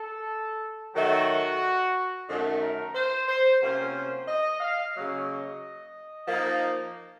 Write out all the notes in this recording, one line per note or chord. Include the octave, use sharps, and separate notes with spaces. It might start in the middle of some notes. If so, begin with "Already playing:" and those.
Already playing: A4
D#3 F#3 A3 F#4
F#2 D#3 A3
A#4
C5
C5
C3 F#3 A#3 C#4 F4 C5
D#5
F5
C#3 F#3 A#3 D#5
F3 A#3 D#4